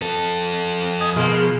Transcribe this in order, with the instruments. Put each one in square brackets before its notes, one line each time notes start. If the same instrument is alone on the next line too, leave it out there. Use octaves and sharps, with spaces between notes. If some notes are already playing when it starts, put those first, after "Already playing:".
[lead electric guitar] F2 A4
[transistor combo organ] D#5 G#5 D#6
[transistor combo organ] B2 F3 [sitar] G#3 A#3